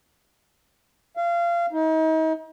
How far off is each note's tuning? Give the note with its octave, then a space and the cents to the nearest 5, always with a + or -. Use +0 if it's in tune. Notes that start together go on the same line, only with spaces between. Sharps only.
F5 -25
D#4 +40